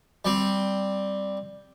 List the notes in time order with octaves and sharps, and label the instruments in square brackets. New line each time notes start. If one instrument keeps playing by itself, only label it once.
[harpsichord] G3 C4